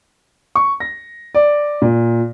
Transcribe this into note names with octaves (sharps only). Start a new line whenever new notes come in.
C#6
A#6
D5
A#2